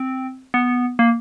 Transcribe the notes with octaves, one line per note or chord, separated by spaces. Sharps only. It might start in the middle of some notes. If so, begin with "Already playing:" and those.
Already playing: C4
B3
A#3